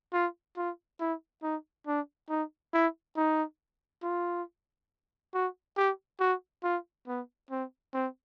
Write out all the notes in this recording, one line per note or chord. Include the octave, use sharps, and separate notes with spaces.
F4
F4
E4
D#4
D4
D#4
E4
D#4
F4
F#4
G4
F#4
F4
B3
C4
C4